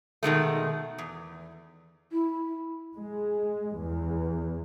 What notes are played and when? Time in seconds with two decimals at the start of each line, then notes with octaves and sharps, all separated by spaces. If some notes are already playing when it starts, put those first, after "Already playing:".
0.23 B2 D#3 G#3 A3
0.98 E2
2.12 E4
2.97 G#3
3.78 E2